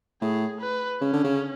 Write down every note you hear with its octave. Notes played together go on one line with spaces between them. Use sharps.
A2 G#4
B4
C#3 C#4
D3
C#3